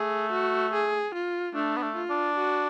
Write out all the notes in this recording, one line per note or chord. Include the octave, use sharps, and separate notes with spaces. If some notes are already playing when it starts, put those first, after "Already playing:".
Already playing: A3 G#4
F#4
G#4
F4
A3 D4
B3
A3
F4
D4
F#4